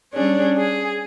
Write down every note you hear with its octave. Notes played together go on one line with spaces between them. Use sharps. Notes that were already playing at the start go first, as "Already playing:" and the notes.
G3 C#4 D4 G#4 C#5
G#4